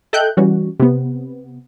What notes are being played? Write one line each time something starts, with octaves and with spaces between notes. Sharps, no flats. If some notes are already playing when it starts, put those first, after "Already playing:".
A4 D#5 E5 G5 F#6 G6
E3 G3 C#4 F#4
C3 B3